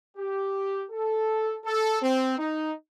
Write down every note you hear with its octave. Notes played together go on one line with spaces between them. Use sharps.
G4
A4
A4
C4
D#4